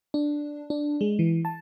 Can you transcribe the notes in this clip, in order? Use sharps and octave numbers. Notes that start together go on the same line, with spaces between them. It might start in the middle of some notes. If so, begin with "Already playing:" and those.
D4
D4
G#3
E3
A5